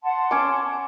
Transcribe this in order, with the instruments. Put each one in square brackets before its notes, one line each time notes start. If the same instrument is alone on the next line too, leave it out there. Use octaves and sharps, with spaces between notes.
[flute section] F#5 A5 C6
[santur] C#4 D6